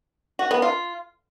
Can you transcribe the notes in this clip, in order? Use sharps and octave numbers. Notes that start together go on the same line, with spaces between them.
F#4
B3
F4